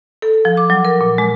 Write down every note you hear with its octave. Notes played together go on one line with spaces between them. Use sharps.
A4
F3
D6
F#3
A#4
A#2
G#3